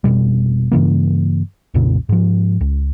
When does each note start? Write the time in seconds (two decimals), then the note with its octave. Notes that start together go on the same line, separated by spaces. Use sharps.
0.04 F1 C2 B2 G3
0.72 G2 C#3 E3 A#3
1.74 B1 F2 A#2 C#3
2.09 G#2 F3
2.61 C#2